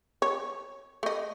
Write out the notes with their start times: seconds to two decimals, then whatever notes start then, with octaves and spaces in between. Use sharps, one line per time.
0.22 C#5
1.03 A3 D#5